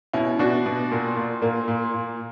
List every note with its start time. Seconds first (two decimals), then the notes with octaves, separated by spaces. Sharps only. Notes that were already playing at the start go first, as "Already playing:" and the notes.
0.13 B2 C#4 E4
0.39 B2 D4 F#4
0.66 B2
0.91 A#2
1.16 A#2
1.42 A#2 A#3
1.68 A#2
1.94 A#2